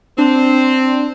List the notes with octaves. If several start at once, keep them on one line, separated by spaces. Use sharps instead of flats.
C4 D4